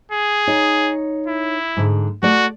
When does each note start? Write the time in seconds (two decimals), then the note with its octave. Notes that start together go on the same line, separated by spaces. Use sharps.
0.12 G#4
0.47 D#4 C#5
1.27 E4
1.77 G#2 D3
2.23 A3 F#4 D5